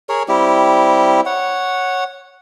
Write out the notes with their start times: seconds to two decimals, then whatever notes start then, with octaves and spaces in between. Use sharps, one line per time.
0.09 G#4 A#4 C#5
0.28 G3 C4 E4 G4
1.26 C#5 F#5